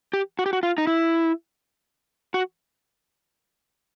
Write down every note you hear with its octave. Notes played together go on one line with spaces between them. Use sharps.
G4
F#4
G4
F#4
F4
D#4
E4
F#4